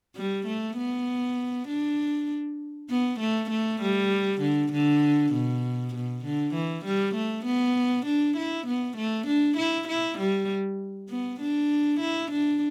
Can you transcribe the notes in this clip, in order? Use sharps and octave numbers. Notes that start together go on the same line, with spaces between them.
G3
A3
B3
D4
B3
A3
A3
G3
D3
D3
B2
B2
D3
E3
G3
A3
B3
D4
E4
B3
A3
D4
E4
E4
G3
B3
D4
E4
D4